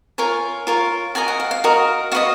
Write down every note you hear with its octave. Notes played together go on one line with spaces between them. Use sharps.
F4 A#4 C#5 G#5
F4 A#4 C#5
F#4 A#4 D#5 G#5
F#5
F5
F5
F#4 A#4 D#5
F#4 B4 D#5 F5